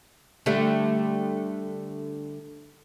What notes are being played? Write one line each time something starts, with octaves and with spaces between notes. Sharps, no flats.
D3 G3 A3